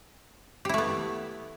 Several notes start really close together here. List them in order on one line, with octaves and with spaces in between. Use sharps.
G4 E4 A3 B3